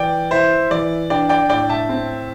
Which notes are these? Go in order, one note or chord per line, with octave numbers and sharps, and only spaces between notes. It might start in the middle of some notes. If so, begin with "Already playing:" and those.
Already playing: E3 D5 G5
E4 C5 E5
E3 D5
D4 D5 G5
D5 G5
A2 D5 G5
E5 A5
C4